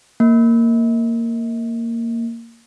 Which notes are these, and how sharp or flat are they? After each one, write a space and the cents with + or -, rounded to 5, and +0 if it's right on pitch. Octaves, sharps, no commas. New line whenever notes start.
A#3 -15